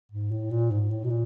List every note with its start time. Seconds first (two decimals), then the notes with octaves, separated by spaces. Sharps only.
0.12 G#2
0.31 A2
0.51 A#2
0.71 G#2
0.91 A2
1.04 B2
1.10 A#2